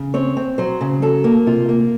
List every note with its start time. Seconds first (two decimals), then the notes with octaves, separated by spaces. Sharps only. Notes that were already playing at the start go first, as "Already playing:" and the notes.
Already playing: C#3
0.14 C4 C#5
0.37 C4
0.58 F#3 C5
0.81 C#3
1.02 F#3 A4
1.24 A#3
1.46 C3 F4
1.69 A#3